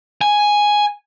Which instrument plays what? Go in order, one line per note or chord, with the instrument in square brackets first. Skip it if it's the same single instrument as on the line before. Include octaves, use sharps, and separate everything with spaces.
[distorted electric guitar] G#5